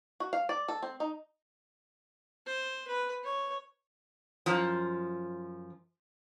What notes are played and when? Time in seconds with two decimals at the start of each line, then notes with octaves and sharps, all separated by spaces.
0.20 F#4
0.33 F5
0.49 D5
0.68 A4
0.83 C4
1.00 D#4
2.46 C5
2.88 B4
3.24 C#5
4.46 F#2 F3